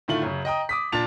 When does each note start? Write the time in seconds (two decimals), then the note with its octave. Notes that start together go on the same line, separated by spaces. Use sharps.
0.08 A2 D3 D#3 A3 F4 F#7
0.23 F#2 C#3
0.45 D#5 G5 A#5 D#6
0.69 D6 D#6 B6
0.92 A#2 D4 A5 A6 F7